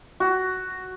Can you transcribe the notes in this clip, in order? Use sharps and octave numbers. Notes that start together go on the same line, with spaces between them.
F#4